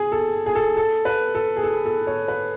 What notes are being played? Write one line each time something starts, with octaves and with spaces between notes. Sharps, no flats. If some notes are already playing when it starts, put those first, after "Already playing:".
Already playing: G#4
A4
G#4
A4
A4
B4
A4
G#4
A4
A4
C#5
B4